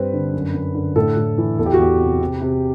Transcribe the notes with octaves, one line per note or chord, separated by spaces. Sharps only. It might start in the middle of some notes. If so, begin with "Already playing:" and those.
Already playing: G2 C4 B4
D3
F#2
F#2
D3
A2 A4
A2
E3
E2 A4
G4
F#4
E2 G4
C3
C3
C3